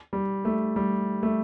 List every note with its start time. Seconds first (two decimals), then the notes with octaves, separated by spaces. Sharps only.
0.13 G3
0.45 A3
0.76 G3
1.23 A3